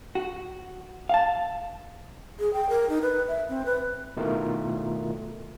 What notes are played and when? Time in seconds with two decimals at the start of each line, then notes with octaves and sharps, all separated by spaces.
0.15 F#4
1.09 F5 A5
2.39 G#4
2.53 G5
2.69 A#4
2.89 D#4
3.02 B4
3.28 E5
3.49 C4
3.65 B4
4.17 B2 D#3 A3 E4 F4 A#4